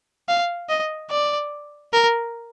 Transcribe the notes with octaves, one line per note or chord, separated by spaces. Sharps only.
F5
D#5
D5
A#4